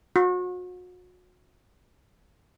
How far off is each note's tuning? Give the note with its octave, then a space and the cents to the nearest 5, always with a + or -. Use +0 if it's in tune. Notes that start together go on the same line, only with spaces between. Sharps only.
F#4 -35